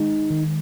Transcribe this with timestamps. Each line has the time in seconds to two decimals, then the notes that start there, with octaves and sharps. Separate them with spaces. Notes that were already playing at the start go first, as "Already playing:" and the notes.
Already playing: D#3 G#3 D#4
0.31 D#3